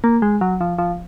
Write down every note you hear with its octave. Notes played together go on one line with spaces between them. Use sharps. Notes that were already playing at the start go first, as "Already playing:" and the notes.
A#3
G#3
F#3
F3
F3